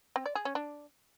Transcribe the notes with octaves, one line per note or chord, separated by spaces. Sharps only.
C4
D5
G#4
C#4
D4